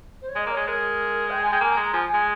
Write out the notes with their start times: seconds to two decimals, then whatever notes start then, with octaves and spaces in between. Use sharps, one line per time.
0.21 C5
0.28 C#5
0.35 G#3 D#5
0.46 A#3 C#5
0.57 G#3
0.67 G#3 A#4
1.30 G5
1.41 G#5
1.51 G#3 G5
1.61 A#3 G#5
1.71 A#5
1.76 G#3
1.82 A#5
1.93 F3 G#5
2.09 G#3 G#5